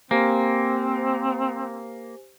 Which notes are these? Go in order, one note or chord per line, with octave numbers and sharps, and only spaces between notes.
A#3 C4 G4 C5 G#5